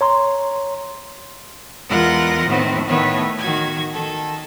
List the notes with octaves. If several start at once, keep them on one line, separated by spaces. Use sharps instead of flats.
C#5 A#5 C6
E2 G#3 F4 A#4 F#5 F#6
A2 D#3 B3 C4
A2 D#3 A3 B3 C#5
D#3 F#4 G#6
D#3 A4